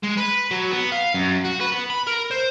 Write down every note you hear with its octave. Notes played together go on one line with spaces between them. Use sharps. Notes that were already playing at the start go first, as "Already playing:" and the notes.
G#3
B4
F#3
B3
F5
F#2
F#4
B4
B3
B5
A#4
C5